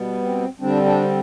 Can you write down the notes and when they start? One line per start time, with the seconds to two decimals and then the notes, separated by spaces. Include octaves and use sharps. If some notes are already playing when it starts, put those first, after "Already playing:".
Already playing: B2 G3 B3
0.22 C4
0.60 D3 G3 C4 D4
0.85 D4